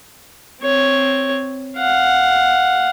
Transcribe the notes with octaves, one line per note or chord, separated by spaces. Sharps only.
C4 C#5
F5 F#5